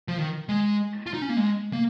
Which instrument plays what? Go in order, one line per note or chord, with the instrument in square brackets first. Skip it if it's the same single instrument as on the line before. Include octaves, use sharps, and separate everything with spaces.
[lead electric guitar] F3
D#3
G#3
F4
D#4
C#4
A#3
G#3
A#3